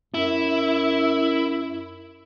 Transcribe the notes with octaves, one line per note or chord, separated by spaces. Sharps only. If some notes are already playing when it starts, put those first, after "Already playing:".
F#2 E4